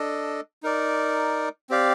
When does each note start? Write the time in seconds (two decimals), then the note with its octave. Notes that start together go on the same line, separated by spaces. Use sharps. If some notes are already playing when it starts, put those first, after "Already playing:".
Already playing: D4 A4 D#5
0.63 D#4 A#4 D5
1.70 C4 G4 D5 F5